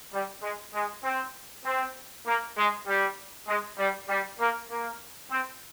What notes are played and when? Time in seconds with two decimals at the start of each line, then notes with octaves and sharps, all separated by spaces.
0.13 G3
0.43 G#3
0.74 G#3
1.04 C4
1.64 C4
2.26 A#3
2.57 G#3
2.87 G3
3.47 G#3
3.78 G3
4.09 G3
4.39 A#3
4.70 A#3
5.30 C4